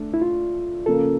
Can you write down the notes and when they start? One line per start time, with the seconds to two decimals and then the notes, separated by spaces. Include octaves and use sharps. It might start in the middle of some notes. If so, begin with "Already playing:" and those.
Already playing: A3 D4 D5
0.14 E4
0.22 F4
0.86 C#3 F3 A#3 C#4 A4